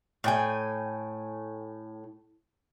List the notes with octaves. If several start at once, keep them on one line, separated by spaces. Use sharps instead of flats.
A2 G5 G#5